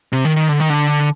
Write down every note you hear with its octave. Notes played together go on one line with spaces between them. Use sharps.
C3
D#3
D#3
D3
D#3
D3